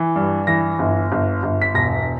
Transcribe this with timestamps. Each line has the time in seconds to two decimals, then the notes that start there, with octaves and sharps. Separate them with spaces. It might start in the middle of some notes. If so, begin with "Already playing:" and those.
Already playing: E3
0.16 G2
0.47 E3 A#6
0.79 G1
1.12 G1
1.43 G1
1.62 B6
1.74 E1 A#6